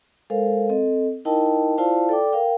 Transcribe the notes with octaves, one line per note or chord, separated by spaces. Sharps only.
G#3 A4 A#4 C5 F5
C4 A4 D#5
D#4 E4 A#4 D#5 G5 A5
E4 F4 C5 D5 F5 A5
A4 D5 G5 D6
A#4 F5 G5